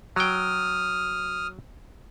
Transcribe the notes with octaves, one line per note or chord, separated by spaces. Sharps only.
F#3 G5 D#6 F6